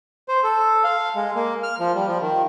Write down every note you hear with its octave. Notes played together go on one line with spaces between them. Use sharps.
C5
A4
F5
G#3
A#3
F6
F3
G3
F3
D#3